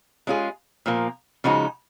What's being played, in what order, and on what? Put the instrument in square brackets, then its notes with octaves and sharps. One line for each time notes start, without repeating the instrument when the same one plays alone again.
[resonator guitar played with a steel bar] G#3 C#4 F4 G#4
A#2 F3 A#3
C#3 F3 G#3 D#4 F#4